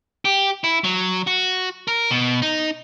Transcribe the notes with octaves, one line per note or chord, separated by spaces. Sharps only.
G4
E4
F#3
F#4
A#4
B2
D#4